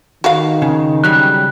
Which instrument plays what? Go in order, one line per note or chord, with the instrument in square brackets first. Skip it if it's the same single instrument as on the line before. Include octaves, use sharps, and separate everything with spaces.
[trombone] D#3 [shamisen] F#4 F5
[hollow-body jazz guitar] C#3
[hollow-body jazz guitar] C#3 F#3 G3 [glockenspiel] F#6